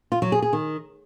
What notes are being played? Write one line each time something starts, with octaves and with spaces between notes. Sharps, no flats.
F4
F#3
G#4
G#4
D#3